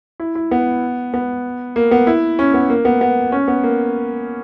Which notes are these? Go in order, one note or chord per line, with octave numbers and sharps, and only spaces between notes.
E4
E4
B3
B3
A#3
B3
E4
C#4
B3
A#3
B3
B3
C#4
B3
A#3